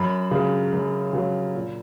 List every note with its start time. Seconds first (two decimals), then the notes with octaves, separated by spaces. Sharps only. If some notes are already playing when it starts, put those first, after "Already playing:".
Already playing: F#2 B5
0.31 C#3 F#3
0.73 F#2
1.13 C#3 F#3
1.54 A#2